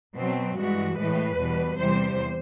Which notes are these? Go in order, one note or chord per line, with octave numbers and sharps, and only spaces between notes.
B2 F#3 C4
G2 E3 G#3 F#4
A2 E3 G#3 B4
E2 B2 G3
E2 C3 E3 G3 C5